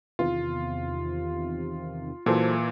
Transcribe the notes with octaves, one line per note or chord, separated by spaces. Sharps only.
E2 C3 D#3 F4
A#2 E3 F#3 A4 C5